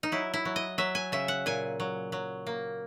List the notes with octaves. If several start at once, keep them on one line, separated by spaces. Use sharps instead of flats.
D#4
F#3 E4
E4
F#3
D#5
F#3 E5
G#5
C#3 E5
F#5
A#2 G#5
F#3
F#3
A#3